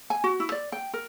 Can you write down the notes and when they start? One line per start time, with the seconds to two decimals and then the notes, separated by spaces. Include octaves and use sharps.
0.10 G#5
0.24 F#4
0.40 E4
0.52 D5
0.72 G5
0.94 A#4